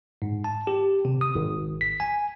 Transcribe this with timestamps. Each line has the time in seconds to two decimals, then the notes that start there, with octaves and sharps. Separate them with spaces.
0.22 G#2
0.44 A5
0.67 G4
1.05 C3
1.21 D#6
1.35 G#1
1.81 B6
2.00 G#5